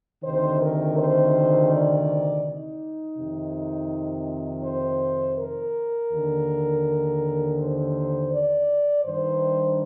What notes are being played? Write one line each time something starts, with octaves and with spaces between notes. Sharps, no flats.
D2 C3 D#3 C5
A#4
C5
D5
D#4
F2 C3 D#3
C5
A#4
D#2 D3
C5
D5
G2 D#3 C5